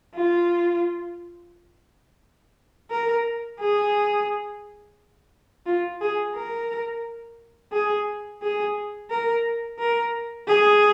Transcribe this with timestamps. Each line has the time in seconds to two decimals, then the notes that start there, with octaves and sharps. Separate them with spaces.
0.15 F4
2.91 A#4
3.60 G#4
5.66 F4
6.01 G#4
6.35 A#4
7.72 G#4
8.42 G#4
9.11 A#4
9.79 A#4
10.48 G#4